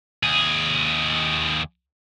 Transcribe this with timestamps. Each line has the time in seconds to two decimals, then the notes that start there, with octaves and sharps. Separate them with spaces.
0.23 D#2 G#4